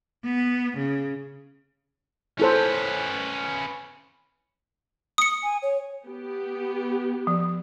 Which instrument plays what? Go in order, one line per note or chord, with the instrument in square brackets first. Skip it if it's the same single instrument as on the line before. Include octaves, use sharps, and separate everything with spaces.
[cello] B3
C#3
[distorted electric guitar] C#4 B4 [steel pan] E4 A4 C5
[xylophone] D#6 C#7
[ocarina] G#5
C#5
[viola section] B3 G4
[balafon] F3